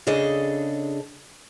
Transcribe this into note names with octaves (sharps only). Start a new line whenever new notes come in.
C#3 D4 G#4 A4 D#5